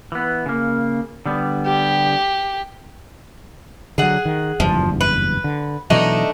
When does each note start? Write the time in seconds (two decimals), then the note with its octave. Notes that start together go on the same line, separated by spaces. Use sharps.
0.12 E3 B3
0.46 C#3 A#3
1.26 D3 G3 B3
1.66 G4
3.98 D3 F#3 G#4 F#5
4.25 D#3
4.60 F#1 E2 G2 F3
5.01 B4
5.44 D3
5.90 B2 E3 F#3 A3 D4 D#4